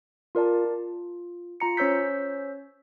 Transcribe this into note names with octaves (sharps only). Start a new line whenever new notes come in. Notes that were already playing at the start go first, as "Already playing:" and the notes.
F4 A#4 D5 A5
F4
F4 A#5 C#7
C#4 C5 C#5 E6 G6 B6